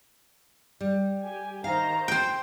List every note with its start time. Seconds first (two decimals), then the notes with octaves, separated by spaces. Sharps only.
0.81 G3
1.23 G4 G#5
1.64 D#3 C5 F5 A#5
2.08 C4 C5 G5